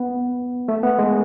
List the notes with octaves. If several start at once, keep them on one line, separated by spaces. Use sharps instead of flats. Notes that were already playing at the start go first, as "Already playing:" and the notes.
Already playing: B3
A3
B3
G#3